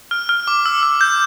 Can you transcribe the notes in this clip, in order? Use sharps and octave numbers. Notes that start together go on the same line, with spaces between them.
F6
F6
D6
E6
E6
G6